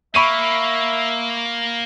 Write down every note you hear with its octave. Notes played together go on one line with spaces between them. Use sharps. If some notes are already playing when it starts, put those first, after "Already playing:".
A#3 E5 B5 C#6 D#7